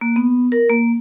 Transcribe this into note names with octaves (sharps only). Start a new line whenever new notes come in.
A#3
B3
A#4
A#3